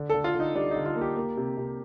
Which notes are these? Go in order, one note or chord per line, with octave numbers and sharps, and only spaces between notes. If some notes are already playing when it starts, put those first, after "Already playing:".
Already playing: D3
A4
D3
F4
D3
D#4
G3 D4
D#4
D3
F4
A#3
G4
A#3
C3
C3